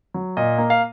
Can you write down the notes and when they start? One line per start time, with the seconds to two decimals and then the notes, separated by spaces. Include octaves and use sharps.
0.14 F#3
0.37 A#2 D#5
0.58 A#3
0.70 F5